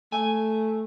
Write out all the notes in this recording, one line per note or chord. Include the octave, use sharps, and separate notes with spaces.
A3 G#5